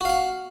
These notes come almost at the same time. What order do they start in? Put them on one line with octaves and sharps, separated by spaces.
F#4 F5 F#5